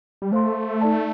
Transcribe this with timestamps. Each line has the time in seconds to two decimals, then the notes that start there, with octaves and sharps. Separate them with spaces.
0.22 G3
0.32 A3 C5 F5 C6
0.81 D#4 A4 D5 A5